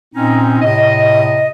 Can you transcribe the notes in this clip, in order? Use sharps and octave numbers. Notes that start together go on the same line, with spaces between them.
A#2 C4 C#4 D#4
A2 C3 D#5